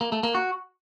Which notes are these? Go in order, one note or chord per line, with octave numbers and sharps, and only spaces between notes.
A#3
A3
A#3
F#4